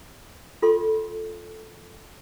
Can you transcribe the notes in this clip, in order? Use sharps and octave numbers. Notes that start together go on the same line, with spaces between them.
F4 A4 C6